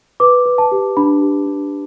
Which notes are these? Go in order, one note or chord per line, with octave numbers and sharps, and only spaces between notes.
B4 D6
B4
A5
G4
D4 B5
G4
D4